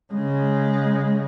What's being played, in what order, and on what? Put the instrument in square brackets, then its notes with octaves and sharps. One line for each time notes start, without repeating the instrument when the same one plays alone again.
[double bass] C#3 G#3